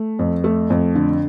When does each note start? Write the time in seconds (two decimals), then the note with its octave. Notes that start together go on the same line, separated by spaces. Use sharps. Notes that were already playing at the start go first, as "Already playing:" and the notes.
Already playing: A3
0.19 F2
0.44 A3
0.70 F2
0.95 D3